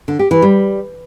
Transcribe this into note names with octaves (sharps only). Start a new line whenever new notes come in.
D3
G4
E3
G3